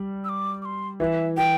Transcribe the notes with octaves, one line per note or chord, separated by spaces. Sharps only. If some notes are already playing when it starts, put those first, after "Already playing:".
Already playing: G3
E6
D6
D6
C6
E3 E5
E3 G5